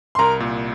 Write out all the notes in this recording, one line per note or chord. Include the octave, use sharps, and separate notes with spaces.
C6
C2 A#4 A#5
A#2